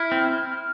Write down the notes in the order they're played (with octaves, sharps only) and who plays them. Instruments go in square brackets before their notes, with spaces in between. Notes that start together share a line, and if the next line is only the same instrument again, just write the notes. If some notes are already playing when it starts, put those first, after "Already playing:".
Already playing: [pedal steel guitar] E4 [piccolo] F6
[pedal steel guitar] C4